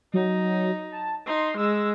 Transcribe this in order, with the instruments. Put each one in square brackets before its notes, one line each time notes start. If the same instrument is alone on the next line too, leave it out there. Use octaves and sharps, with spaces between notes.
[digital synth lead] F#3 [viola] D#4
[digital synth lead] A5
[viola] D#4 [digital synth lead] C6
[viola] G#3 [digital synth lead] E6